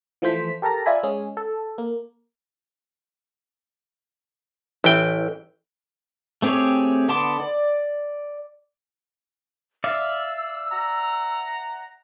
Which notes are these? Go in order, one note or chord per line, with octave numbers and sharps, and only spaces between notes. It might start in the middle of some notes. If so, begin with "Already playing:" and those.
E3 F3 A3 C5 B6
G4 A4 A#4 A5 A#5
F4 D5 E5 G#5 B5
G#3 C#4 G#4
A4
A#3
A1 E3 G5
A3 C4 G4 G#4 C#5
D3 B3 A5 C6 D6
D5
D5 E5 F5 E6
F#5 A#5